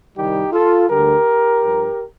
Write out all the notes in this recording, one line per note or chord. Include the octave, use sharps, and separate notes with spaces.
C2 C3 D#3 G3 D#4 G4
F4 A4
D2 D3 G3 G4 A#4
G2 F3